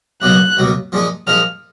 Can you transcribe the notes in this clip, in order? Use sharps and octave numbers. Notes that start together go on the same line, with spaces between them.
C#2 B2 F#3 A#3 F#6
C#2 B2 F#3 A#3
A#2 F3 G#3 D#4
A#2 F3 G#3 D#4 F6